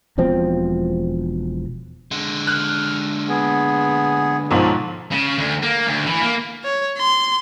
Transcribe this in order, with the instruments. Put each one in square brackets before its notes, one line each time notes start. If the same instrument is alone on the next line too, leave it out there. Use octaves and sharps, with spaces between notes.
[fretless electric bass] E1 B2 F3 C4
[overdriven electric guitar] D3 G#3
[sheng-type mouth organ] F6 [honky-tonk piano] F#6
[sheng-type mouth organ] B3 G#4
[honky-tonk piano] B1 G#2 F3
[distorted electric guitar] C#3
D2
A#3
D2
E3
A#3
[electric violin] C#5
C6